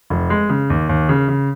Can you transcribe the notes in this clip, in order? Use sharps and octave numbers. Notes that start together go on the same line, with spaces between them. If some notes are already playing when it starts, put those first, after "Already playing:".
F1
G#3
C#3
D#2
D#2
C#3
C#3